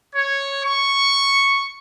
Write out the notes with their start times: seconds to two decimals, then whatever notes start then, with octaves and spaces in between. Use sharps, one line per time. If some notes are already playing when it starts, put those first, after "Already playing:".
0.15 C#5
0.64 C#6